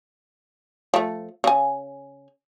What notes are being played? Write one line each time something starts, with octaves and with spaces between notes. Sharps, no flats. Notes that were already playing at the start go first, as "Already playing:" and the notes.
F3 A3
C#3 G#5